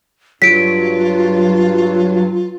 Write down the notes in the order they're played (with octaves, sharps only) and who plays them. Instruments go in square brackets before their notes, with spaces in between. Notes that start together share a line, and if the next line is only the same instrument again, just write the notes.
[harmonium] G2 [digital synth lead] F#3 [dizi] F4 [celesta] B6 D7